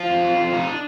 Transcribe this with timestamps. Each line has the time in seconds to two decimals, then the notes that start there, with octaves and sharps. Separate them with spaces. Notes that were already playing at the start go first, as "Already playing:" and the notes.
Already playing: F3 F4
0.09 F2
0.23 F2
0.38 F2
0.52 F2 D#4
0.67 D4